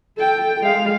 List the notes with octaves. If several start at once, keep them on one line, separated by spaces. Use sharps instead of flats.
A4 G5
G#3 F5